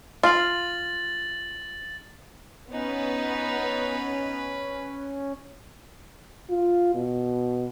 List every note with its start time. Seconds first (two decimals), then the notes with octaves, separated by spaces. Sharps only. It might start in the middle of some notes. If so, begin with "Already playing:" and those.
0.23 F4 A6 F#7
2.72 B3 C#4 D#4 B4
6.50 F4
6.94 B2